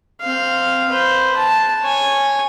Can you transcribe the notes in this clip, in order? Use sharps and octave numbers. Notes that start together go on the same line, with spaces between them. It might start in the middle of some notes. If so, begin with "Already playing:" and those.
C4 F5
B4 C5
A5
C#5 G#5